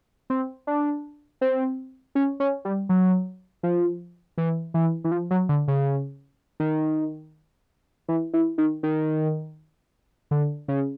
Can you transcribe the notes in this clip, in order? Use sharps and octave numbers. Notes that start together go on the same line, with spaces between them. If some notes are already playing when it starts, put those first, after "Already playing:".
C4
D4
C4
C#4
C#4
G3
F#3
F3
E3
E3
E3
F3
F#3
D3
C#3
D#3
E3
E3
D#3
D#3
D3
C#3